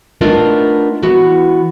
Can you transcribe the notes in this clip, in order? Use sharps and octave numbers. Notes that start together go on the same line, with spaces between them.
A3 B3 D4 D#4 F4 A#4
E3 B3 F#4